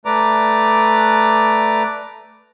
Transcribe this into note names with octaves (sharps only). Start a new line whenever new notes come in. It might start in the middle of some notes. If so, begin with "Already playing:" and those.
A3 B4 D5 A#5 D6